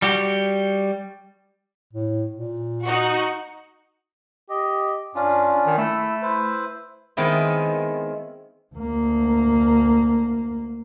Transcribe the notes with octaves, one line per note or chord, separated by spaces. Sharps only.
G3 F#4 G4
A2
A#2
D#4 F#4 C#7
G4 D#5
G2 C#4 D4 F4
D#3
A3 E4
E4 B4 C5
D#3 G#3 B3 C4 E4
D2 A#3